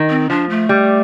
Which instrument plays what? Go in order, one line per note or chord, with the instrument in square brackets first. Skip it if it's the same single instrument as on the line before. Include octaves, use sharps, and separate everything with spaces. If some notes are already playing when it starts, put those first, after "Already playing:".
Already playing: [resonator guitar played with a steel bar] D#3
[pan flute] C4
[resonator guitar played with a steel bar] F3 [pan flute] D4
[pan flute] A3
[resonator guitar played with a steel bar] G3